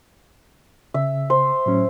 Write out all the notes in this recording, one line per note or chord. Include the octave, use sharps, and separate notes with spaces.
C#3 E5
C5
A2 F#3 C#4